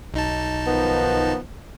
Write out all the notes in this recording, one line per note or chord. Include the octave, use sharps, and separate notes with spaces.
B1 D#4 A5
D#3 F3 B3